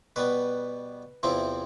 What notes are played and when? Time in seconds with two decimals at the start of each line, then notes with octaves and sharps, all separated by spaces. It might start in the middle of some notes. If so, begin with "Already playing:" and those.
0.16 B2 G3 B3 B4
1.23 E2 C3 F3 C4 E4